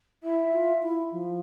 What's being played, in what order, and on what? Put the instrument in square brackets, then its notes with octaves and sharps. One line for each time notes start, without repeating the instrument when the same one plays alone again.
[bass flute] E4 [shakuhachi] E5
[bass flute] F4
E4
F3